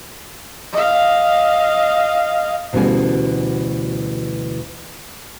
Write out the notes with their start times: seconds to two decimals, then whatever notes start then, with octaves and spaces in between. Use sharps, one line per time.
0.73 D#5 F5
2.73 D2 B2 E3 G3 C#4 G#5